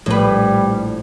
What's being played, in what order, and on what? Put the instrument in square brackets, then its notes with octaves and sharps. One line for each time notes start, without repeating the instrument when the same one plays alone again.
[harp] A#1 [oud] A2 B4 [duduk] G3